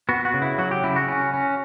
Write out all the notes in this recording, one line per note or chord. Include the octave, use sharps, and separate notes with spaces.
B3 F#4
F#4
C#3
E4
F#3 F#4
G4
C#3 E4
F#4
C#4
C#4